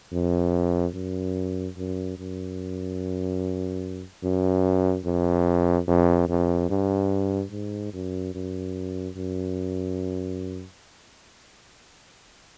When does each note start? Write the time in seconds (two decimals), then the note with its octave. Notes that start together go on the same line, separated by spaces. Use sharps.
0.13 F2
0.94 F#2
1.77 F#2
2.18 F#2
4.23 F#2
5.05 F2
5.87 F2
6.29 F2
6.69 G2
7.52 G#2
7.93 F#2
8.35 F#2
9.17 F#2